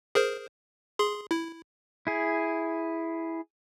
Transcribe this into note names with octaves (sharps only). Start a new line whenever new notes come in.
G#4 A#4 C5
G#4 C6
E4
E4 G#4